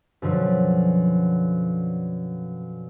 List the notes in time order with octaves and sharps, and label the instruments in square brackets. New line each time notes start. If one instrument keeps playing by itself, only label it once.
[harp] F#2 B2 D3 F3